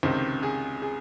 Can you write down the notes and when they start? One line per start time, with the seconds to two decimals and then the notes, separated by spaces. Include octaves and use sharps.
0.03 C#2 C3 D#3 C5
0.43 G#4
0.82 G#4